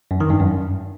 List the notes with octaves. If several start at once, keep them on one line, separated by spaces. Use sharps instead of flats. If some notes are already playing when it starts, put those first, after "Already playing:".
F#2
D#3
G2
F#2